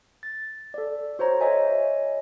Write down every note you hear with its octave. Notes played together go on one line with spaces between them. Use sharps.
A6
A4 D5
F#4 C5 C#5 A#5
C#5 D#5 E5 G#5